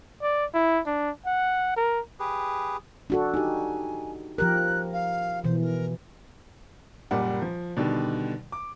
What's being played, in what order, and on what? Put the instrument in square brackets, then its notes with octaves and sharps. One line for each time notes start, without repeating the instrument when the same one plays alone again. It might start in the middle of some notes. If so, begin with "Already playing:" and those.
[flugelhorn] D5
E4
D4
F#5
A#4
[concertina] G4 G#4 B4
[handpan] D4 F#4 A4
[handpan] D#4 G4 [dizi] G#5
[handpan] F3 G4 A#4 [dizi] F#6
[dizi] F5
[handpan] B2 E3 [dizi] C5
[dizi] A#4
[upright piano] F#1 A#2 G3 F#5
F3
B2 D3 D#3 G3
D6